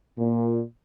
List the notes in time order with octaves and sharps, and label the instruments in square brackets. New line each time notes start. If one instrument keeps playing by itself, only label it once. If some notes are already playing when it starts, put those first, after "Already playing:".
[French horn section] A#2